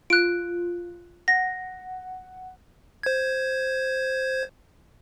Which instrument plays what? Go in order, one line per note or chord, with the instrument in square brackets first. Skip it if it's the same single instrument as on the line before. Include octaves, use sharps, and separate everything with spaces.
[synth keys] F4 [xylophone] F#6 D7
[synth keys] F#5 [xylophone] A#6
[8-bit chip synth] C5 G#6